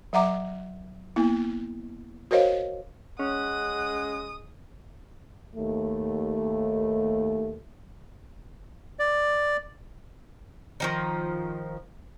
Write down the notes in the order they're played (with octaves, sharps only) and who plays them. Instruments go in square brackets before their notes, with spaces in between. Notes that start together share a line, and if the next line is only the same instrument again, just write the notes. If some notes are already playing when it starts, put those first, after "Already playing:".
[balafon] F#3 E5 F#5 A#5 D6
A#3 B3 E4
F#4 A#4 C5 C#5 D#5 F5
[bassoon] G#3 [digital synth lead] C#4 [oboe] F#5 [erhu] D#6
[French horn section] D#2 A3
[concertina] D5
[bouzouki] D#3 F3 D#4